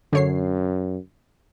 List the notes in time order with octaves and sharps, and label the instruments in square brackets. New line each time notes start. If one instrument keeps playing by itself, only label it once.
[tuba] F#2 [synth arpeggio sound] D3 C#5 C7